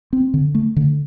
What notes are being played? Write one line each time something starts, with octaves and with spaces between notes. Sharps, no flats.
C4
D3
A3
D3